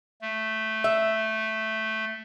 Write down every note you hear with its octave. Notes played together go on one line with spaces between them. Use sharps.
A3
E5